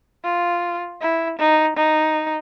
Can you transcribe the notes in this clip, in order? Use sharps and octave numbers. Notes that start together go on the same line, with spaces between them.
F4
E4
D#4
D#4